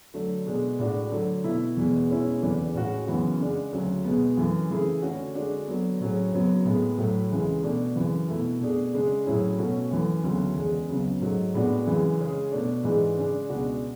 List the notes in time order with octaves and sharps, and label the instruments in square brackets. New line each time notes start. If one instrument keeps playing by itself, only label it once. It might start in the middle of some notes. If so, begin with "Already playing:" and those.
[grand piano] D3 F#3 A3
B2 G#3 D4
A2 G#3 D4 F#4
D3 F#3 A3
B2 A3 E4
E2 B2 G#3
B2 G#3 C#4 E4
E2 C#3 E3 A3 D4
A2 G#3 C#4 F#4
F#2 C#3 E3 B3 F#4
C#3 G#3 D4
D2 C#3 F#3 A3
B2 G#3 B3
F#2 E3 A3
C#3 E3 A3 E4 G#4
D3 A3 C#4 F#4
D3 G#3 D4 F#4
D3 F#3 B3
A2 F#3 C#4 G#4
F#2 C#3 F#3 B3
A2 G#3 B3
A2 F#3 A3
C#2 C#3 E3 G#3
B2 A3 D4
F#2 C#3 E3
B2 A3 E4
B2 A3 D4 G#4
C#3 G#3 D4 G#4
A2 F#3 C#4 E4 G#4
B2 A3 C#4 F#4
F#2 E3 A3
D2 C#3 F#3 B3
E2 C#3 G#3
C#2 C#3 F#3 B3
G#2 F#3 A3
A2 G#3 B3 D4 F#4
F#2 C#3 E3 G#3
C#3 G#3 C#4 G#4
B2 A3 D4
G#2 E3 G#3 D4 G#4
C#3 G#3 D4
C#2 B2 G#3 D4 F#4